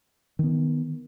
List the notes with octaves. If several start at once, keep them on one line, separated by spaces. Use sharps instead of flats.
D#3 B3